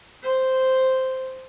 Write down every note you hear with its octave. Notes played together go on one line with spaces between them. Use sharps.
C5